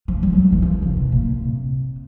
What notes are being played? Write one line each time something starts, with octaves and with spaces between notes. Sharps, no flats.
F3
G3
F#3
E3
F3
C#3
B2
A#2
C3